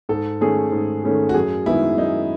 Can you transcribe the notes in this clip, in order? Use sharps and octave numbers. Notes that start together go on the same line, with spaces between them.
G#2 A4
D#3 A3 C#4 G#4
G#2
D#3 A3 C#4 G#4
F#4
F#2 G#4
D#3 G#3 B3 E4
F#2 D#4